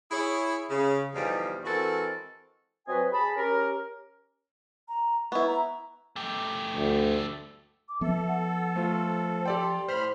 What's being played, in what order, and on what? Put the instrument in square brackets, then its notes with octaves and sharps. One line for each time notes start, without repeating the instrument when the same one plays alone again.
[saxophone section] E4 G#4 C#5
C#3
E2 B2 D3 F3 G3 D#4
E3 G#3 C4 F#4 A4 A#4
[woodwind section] F#3 C4 F#4 B4 D#5 G#5
G#4 A5 B5
C#4 G4 A#4
[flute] A#5
[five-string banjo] B3 E4 [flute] C#6
[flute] A#5
[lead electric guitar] A3 G4
[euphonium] D2
[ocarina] D6
[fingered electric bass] F3 B3 [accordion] A4 [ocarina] E5
[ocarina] F#5
[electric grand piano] A3 F4 [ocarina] C5
[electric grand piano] G4 D5 G5 [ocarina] C6
[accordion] A2 B5 F6 [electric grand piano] C5